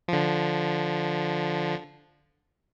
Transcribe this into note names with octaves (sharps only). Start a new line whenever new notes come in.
D3 F3